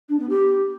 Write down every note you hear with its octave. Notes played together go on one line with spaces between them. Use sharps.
D4
B3
G4